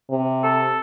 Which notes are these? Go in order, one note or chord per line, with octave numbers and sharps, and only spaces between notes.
C3
A4